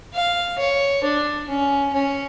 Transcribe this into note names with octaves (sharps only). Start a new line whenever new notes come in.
F5
C#5
D4
C#4
C#4